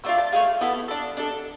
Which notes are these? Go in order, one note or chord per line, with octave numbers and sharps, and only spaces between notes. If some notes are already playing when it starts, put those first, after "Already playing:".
A3 D4 F4 E6
A5
A3 E4 G#4 F5
B3 E4 A4
D4 A4
D4 A4